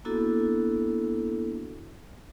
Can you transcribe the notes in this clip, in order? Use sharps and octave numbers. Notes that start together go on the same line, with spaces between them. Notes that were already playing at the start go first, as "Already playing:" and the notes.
A#3 B3 D4 E4 F#4 A4